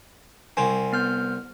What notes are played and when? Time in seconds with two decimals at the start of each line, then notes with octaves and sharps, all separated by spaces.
0.57 C2 C4 G#5
0.93 B3 F6 G6